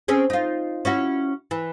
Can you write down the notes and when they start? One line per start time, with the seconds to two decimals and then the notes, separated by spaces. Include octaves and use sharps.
0.08 C4 C#4 G#4
0.30 D#4 F4
0.85 C#4 E4 F#4
1.51 E3